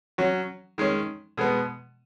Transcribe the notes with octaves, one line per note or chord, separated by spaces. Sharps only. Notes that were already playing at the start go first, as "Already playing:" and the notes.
F#3 C#4 F#4
D#3 G#3 C#4
B2 G#3 B3